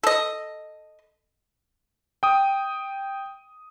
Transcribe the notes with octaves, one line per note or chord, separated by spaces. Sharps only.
A4 D#5
G5 D#6